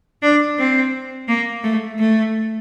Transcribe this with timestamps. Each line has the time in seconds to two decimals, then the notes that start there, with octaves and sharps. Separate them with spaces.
0.22 D4
0.59 C4
1.28 A#3
1.63 A3
1.99 A3